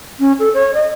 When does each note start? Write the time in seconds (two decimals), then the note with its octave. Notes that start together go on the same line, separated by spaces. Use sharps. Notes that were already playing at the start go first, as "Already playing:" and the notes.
0.20 C#4
0.39 A4
0.54 C#5
0.74 D#5